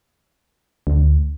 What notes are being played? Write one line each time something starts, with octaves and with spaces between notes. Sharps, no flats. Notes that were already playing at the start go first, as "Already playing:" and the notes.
D2